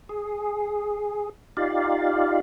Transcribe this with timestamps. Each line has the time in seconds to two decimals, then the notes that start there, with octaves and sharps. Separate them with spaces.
0.09 G#4
1.57 D#4 F4 G4 D5 F5